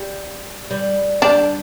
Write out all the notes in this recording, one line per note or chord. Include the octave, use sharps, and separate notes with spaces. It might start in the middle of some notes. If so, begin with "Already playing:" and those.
Already playing: G3
G3
G3 D4